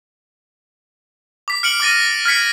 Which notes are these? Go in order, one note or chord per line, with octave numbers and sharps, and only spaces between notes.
D6 B6
F6 C#7 D7 F#7
D6 F6 A6 A#6 D#7
F6 G#6 B6 C#7